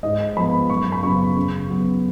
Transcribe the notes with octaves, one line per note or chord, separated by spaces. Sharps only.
G#2 D#5
F3 B3 B5
F#2 C#6
B5
C#3 F#3 B3 C#6
C#3
F#3 B3